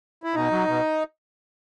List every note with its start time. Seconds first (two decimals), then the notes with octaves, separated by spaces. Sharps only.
0.23 E4
0.34 B2 D#4
0.51 F#3
0.67 B2